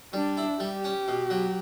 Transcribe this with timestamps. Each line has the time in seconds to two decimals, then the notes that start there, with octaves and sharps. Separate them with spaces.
0.13 G3 D4
0.37 E4
0.60 G3 G4
0.84 C#4
1.08 B2
1.30 F#3